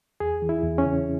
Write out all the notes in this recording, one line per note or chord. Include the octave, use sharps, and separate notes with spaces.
E2 G#4
E3
E4
E2
C#4
C#3